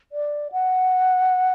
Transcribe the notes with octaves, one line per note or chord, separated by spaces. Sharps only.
D5
F#5